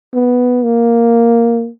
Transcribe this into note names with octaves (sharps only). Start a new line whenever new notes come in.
B3
A#3